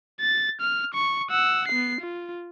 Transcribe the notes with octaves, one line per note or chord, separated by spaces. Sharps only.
A6
F6
C#6
F#5 E6
B3 C7
F4